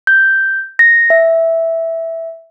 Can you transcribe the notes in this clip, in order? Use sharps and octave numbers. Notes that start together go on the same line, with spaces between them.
G6
A#6
E5